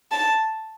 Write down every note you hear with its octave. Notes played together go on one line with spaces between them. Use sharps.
A5